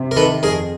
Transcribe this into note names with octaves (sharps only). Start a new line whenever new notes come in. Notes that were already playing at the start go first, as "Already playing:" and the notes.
Already playing: C3
A#4
D#3 A4 B4
F2 G#4 A#4